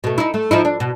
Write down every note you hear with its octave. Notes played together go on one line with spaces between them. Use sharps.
B2 A3
D#4 E4
A3
F3 D#4 E4
D4
B2